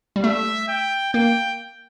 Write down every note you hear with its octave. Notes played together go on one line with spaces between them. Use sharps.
G3
A3 E5
G5
A#3 G5